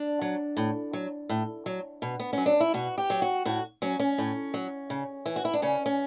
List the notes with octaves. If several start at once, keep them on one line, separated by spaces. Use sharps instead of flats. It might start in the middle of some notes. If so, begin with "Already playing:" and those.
Already playing: D4
F#3
A2
F#3
A2
F#3
B2
B3
F#3 C#4
D4
E4
B2 F#4
G4
F#3
F#4
A2 F#4
F#3 C#4
C#4
A2
F#3
C#3
E3
F#4
E4
D4
C#3 C#4
C#4